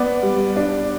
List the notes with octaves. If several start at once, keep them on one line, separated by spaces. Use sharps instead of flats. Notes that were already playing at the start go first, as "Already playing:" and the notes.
Already playing: B3 D5
G3
D4